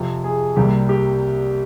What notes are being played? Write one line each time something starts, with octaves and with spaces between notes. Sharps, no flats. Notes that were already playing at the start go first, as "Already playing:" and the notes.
Already playing: F2 C3 F3
G#4
C2 C3 G3 A#3 G4
G4